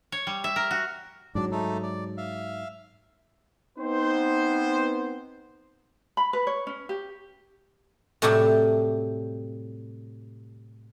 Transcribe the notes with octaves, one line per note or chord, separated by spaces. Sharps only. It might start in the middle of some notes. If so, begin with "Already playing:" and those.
C#5
G3
E5
A#4
F#4
G#2 F#3 D4 D5
A3 D#4 A4
D5
E5 F5
B3 C4 D#4 C5
B5
B4
C#5
C#4
G4
A2 C3 F#3 G3 E4 G4